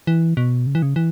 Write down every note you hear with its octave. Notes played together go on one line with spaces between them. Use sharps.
E3
B2
C#3
E3
C#3
E3